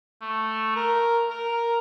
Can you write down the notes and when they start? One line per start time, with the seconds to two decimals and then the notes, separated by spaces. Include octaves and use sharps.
0.21 A3
0.76 A#4
1.30 A#4